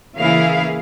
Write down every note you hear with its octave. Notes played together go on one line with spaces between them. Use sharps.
C#3 E3 A#3 E4 G#4 F5